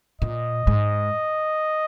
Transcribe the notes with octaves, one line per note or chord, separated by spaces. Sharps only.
A#2 D#5
G#2